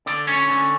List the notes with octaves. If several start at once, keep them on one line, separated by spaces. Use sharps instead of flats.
D3 D5
C#4 C#5
D3